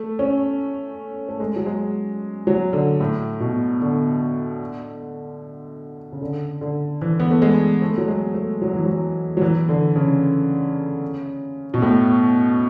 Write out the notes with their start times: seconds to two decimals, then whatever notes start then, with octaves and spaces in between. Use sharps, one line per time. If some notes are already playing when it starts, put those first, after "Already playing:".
Already playing: A3
0.19 C#4
1.29 A3
1.40 G#3
1.56 F#3
1.66 G#3
2.47 F#3
2.73 D3
3.00 A2
3.40 B2
3.81 D3
6.12 C#3
6.22 D3
6.61 D3
7.01 E3
7.20 B3
7.31 A3
7.42 G#3
7.82 A3
7.98 F#3
8.08 G#3
8.34 A3
8.62 F#3
8.73 E3
8.85 F#3
9.37 F#3
9.41 E3
9.69 D3
9.96 C#3
11.74 B2
11.82 A2